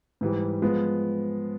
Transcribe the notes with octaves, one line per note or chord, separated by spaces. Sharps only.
G#2 E3 G3
F3 G#3 B3